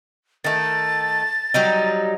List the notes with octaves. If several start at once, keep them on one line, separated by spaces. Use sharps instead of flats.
D#3 A3 A6
F#3 G3 D#4